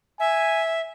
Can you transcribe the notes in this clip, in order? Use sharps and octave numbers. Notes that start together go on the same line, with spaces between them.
E5 G#5